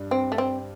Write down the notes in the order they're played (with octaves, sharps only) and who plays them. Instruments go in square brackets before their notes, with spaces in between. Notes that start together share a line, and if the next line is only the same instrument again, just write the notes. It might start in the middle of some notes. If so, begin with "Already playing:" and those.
Already playing: [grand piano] G2 G3 D4
[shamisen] C4
A3
C4